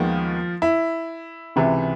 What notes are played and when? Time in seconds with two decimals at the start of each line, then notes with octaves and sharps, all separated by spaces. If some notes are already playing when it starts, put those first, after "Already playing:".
Already playing: D#2 D#3 F3 G#3 B3 F4
0.62 E4
1.56 C#2 C3 E3